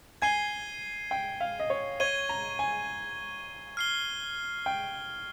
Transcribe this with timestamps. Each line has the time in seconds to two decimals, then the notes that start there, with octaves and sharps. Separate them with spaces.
0.22 G#5 G#6 C7 D#7 G7
1.11 G5
1.41 F5
1.60 D#5
1.70 C#5
2.00 C#5 C#6 G#6 D#7 G7
2.29 A#5
2.59 G#5
3.77 F6 C7 G7
4.66 G5